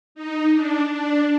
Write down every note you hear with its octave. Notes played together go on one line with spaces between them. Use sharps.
D#4
D4
D4